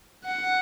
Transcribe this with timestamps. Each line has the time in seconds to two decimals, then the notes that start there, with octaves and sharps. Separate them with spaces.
0.25 F#5